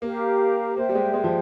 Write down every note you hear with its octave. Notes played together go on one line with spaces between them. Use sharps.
A#3 G4 A#4 F5 A#5
A#3 C5 E5 G5
G3
G#3
G#3
F3